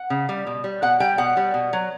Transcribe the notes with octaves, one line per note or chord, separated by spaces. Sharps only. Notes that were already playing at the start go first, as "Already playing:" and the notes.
Already playing: F#5
C#3
G3
B2
G3
B2 F#5
G3 G5
B2 F#5
G3
B2
F#3